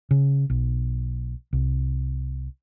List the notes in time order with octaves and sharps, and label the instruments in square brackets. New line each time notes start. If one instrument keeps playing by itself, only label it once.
[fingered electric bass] C#3
B1
C2